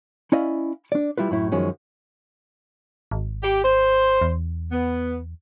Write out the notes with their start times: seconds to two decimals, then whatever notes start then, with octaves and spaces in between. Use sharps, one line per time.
0.32 C#4 E4 D5 D#5 F5
0.92 D4 D5
1.18 G3 E4 F4 B4
1.31 F#2 A2 E4
1.52 F#2 D#3 F3 G#3 C#4
3.11 G#1
3.43 G4
3.64 C5
4.21 E2
4.72 B3